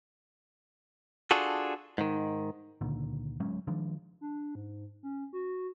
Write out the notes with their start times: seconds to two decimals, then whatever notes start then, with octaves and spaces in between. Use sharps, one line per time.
1.31 D4 F4 F#4 G#4 A4
1.98 G#2 D#3
2.81 C#2 A#2 D3 D#3
3.40 D1 F#3 G#3 C#4
3.67 D#3 F3 G#3 D4
4.21 D4
4.55 G#2
5.03 C#4
5.33 F#4